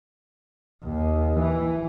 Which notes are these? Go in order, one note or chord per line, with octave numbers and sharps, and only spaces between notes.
D#2
E3